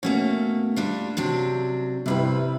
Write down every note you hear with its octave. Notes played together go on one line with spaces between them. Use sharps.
B2 A3 A#3 C#4
G3 D4 F4
C3 F#3 D4
G2 C3 F3 G3 E4 B4